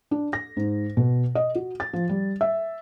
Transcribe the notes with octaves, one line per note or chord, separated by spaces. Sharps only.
D4
A#6
G#2
B2
D#5
F#4
A6
F3
G3
E5